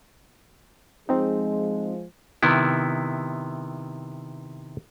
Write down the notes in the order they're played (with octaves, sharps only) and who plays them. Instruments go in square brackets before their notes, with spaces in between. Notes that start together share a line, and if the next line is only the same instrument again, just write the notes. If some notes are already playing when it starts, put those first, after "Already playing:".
[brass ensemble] F3 G#3 [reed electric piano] C4 D#4
[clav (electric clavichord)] C3 D#3 B3 E4